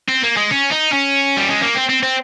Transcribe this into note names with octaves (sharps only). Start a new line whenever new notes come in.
C4
A#3
G#3
C#4
D#4
C#4
G3
G#3
A#3
C4
C4
C4